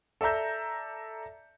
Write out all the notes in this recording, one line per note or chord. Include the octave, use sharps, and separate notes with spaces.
A4 D5 E5 A#5 G6